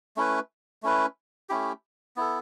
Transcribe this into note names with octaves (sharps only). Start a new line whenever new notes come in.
A3 C#4 E4 B4
A3 C#4 E4 B4
A3 C#4 E4 G4
B3 E4 A4